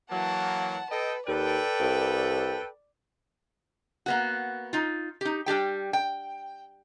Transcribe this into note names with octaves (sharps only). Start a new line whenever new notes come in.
E3 F#3 A#3 F#5 A5
A4 B4 D#5 G5
D#2 A4 B4 D5 G5
C2
A#3 B3 F#4
D#4 F4
D#4 G4
G3 D4 G4 G5
G5